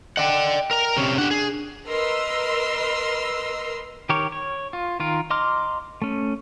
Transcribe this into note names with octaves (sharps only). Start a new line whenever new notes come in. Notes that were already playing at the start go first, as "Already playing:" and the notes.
D5 D#5 F#5 G5
A#4 A#5
C3 C#4
D4 G4 F#5
G#4
A#4 B4 D#5 C6 E6 F6
D#3 G4 A#4 C#5
C#5
F4
D#3 F4 A#4
D#5 A#5 C6 D6 F6
A3 C#4